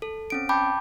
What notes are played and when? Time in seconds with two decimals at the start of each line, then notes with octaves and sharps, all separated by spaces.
0.02 A4
0.30 C4 C#4 D7
0.49 G5 A5 B5 D6 G6